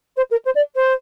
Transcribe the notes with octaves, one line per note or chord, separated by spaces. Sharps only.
C5
A#4
C5
D5
C5